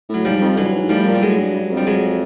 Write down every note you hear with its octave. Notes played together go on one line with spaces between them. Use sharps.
A2
F#3
G#2 F3 G3
F2
G2 E3 F#3
G#2
A2 F3 G3
A#2
G3
A2 F#3 G#3
G2
G2
F2
G3
F#3 G#3